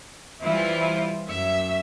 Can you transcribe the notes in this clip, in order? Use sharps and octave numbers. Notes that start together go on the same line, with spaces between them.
E3 G3 E4 F4 C5
F#2 E5